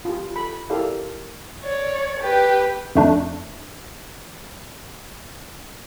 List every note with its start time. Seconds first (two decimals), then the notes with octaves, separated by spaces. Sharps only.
0.05 F4 G4
0.36 A4 B5
0.70 E4 G4 A4 A#4 D5 F5
1.64 C#5 D5
2.20 G4 B4
2.95 F2 A3 D4